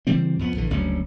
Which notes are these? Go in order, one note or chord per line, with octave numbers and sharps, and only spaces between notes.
C#3 E3 G3 C4
F2 F3 B3
A#1 D3 E3
F#1 D2 G3 C#4